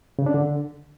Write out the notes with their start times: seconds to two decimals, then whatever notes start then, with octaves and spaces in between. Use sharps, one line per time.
0.19 C#3
0.26 D4
0.34 D3